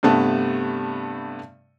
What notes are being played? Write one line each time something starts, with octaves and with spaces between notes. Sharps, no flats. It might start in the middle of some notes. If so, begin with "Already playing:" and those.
G2 C3 A3 B3 A5